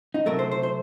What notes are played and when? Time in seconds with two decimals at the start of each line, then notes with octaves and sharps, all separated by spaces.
0.14 D#4
0.26 C3 F#3 A3 A#4
0.39 C5
0.51 C5
0.63 C5